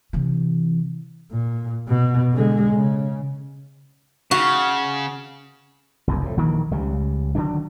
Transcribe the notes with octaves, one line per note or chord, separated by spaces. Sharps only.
C3 E3
A#2
B2
D3 G#3
C#3
C#3 F#4
F#1 C2 F#2
F2 A2
A#1 D#3 E3 A#3
C#2 C#3 G3
D3 D#3 F#3 D4